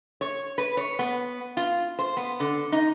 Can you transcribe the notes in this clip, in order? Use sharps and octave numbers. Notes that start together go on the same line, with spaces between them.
C#5
B4
C#5
B3
F4
C5
B3
D3
D#4